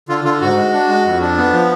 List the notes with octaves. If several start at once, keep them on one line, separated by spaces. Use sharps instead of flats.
D3 F4
D3 F4
G#2 F#4
G#3
D4
G#3
F2
D4
B3
F3